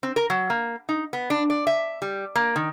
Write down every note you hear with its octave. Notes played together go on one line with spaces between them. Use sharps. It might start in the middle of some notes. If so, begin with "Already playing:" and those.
C4
A#4
F#3
A#3
D#4
B3
D4
D5
E5
G3
A#3
D#3